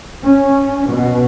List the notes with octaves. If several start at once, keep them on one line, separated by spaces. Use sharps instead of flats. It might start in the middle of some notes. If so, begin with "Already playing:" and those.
C#4
B2